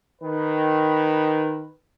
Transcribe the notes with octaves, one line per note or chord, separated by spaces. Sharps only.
D#3 B4